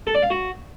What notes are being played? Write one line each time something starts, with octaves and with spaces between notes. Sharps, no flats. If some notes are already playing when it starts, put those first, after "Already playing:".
A4
D5
F5
F#4